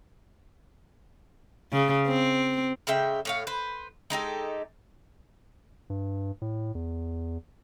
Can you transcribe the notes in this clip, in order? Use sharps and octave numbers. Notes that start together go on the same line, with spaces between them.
C#3
C4
C#3 G#3 E5 G5
A2 C#5 F5
B4 C5
G#3 D#4 G4 A4
G2
A2
E2